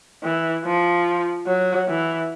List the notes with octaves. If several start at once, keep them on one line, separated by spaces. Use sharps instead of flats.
E3
F3
F#3
E3